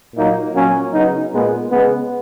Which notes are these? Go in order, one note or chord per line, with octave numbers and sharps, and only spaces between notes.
A#2 F#3 A#3 D#4
A#2 F#3 A#3 C#4
C#3 F#3 B3 D#4
A#2 G#3 B3
C#3 G#3 B3